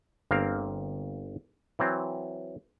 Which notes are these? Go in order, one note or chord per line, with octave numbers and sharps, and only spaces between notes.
G1 A#3 C4 F5
E3 F#3 C4